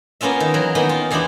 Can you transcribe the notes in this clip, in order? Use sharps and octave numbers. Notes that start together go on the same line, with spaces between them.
A#3 B3 C#4 F4 E5
D#3
E3 F#3 A#4
D#3 A#3 B3 G5 B5
F4
E2 E3 G#3 D4 E4 G4